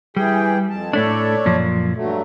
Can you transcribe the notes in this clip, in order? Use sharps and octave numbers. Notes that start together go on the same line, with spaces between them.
E3 G3 G#4 G5
F2 A5
A2 A3 D4 A4 C#5 D5
F#2 A#2 F3
G2 F#3 A3